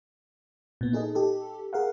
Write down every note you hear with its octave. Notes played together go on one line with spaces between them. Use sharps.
A#2 B3
D#4 G#4 A4 D#5
G4 A4
G#4 A#4 F5 F#5